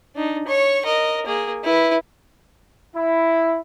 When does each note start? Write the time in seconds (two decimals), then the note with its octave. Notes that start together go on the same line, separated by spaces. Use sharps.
0.16 D4 D#4
0.47 C#5 C#6
0.85 A#4 D#5
1.26 A#3 G#4
1.64 E4 B4
2.96 E4